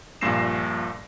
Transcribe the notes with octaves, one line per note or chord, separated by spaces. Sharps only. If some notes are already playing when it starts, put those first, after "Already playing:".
A#1 G2 A#2 A#6 C7 E7